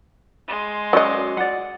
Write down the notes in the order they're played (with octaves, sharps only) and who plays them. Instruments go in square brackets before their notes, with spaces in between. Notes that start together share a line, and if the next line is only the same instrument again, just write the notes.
[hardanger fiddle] G#3 C6
[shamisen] F#3 D#5 [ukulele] C#4 F#4 D5
[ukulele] D5 F#5